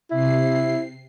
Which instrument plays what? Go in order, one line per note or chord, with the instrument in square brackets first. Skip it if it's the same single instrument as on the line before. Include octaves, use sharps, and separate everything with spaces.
[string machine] C3 C7 [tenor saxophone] E4